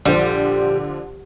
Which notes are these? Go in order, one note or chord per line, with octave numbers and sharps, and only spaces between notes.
A#1 D3 F3 G3 C5